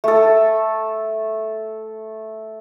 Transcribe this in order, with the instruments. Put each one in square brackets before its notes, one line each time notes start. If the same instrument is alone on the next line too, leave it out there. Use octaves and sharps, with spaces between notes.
[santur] A3 A4